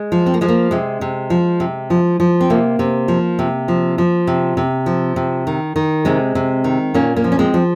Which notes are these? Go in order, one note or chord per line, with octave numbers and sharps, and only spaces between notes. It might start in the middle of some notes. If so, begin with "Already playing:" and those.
Already playing: G#3
F3
C4
A#3
F3 G#3
A#3
C3 G#3
C3
F3
C3
F3
F3
C4
C3 A#3
C3
F3
C3
F3
F3
C3
C3
F3
C3
D#3
D#3
C3 G#3 C4
C3
D#3
A#2 A#3 C#4
A#3 C#4
F3
C#4
G#3 C4
F3